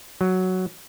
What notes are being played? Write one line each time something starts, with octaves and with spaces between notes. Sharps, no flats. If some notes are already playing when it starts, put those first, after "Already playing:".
F#3